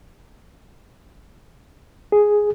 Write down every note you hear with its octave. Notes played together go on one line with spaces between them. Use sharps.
G#4